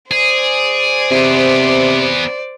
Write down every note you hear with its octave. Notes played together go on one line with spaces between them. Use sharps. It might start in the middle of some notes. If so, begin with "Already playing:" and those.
G#4 C5 D5
C3 B3 G#4